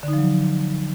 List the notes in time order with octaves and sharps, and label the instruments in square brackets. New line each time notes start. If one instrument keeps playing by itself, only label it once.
[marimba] D3
D#4
F3
F#3